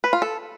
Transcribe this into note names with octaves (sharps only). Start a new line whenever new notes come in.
B4
F4
A4